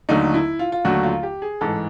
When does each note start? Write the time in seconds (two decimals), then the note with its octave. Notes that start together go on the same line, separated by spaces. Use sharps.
0.09 D#2 D3 F#3 A3 D#4
0.34 E4
0.59 F4
0.72 F4
0.85 D#2 D3 F#3 A3 F#4
1.03 F4
1.23 G4
1.42 G#4
1.61 A1 G#2 E3 A4